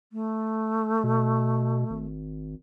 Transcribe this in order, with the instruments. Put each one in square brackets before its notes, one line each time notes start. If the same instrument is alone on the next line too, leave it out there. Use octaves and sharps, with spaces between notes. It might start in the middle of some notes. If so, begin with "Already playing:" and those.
[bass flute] A3
[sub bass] B2
G#1